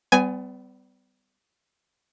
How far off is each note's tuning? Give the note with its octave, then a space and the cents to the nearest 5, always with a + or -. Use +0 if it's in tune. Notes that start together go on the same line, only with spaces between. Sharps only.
G3 -20 B3 +35 G#5 +0